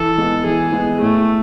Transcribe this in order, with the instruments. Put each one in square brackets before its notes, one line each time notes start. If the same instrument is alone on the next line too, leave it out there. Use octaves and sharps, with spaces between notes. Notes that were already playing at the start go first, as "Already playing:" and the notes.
Already playing: [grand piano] E3 [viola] A4
[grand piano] G#3 B3
[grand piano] E3 [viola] G#4
[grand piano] G#3 B3
[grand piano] A2 [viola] A3